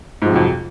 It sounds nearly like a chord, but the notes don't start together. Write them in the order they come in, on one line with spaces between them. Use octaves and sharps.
G#2 F3 C3 F#3 F2